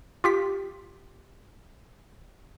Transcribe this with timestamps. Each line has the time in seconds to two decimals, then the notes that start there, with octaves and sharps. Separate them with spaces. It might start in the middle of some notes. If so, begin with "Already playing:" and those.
0.24 F4 G4 B6